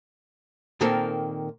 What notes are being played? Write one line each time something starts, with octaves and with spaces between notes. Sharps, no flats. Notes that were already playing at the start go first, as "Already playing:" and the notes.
A#2 D#3 A#3 C4 A4 A#4